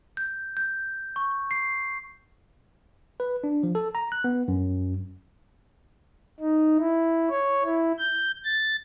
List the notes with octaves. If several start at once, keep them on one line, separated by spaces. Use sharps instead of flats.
G6
G6
C#6
C7
B4
D4
F3
A4
A#5
F#6
B3
F#2
D#4
E4
C#5
E4
G6
A6